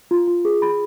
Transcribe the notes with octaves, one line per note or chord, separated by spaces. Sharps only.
F4
F4
G#4
B5